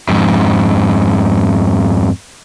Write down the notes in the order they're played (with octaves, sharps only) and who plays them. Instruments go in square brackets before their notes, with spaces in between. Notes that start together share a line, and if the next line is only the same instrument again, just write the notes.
[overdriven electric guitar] F2 G#2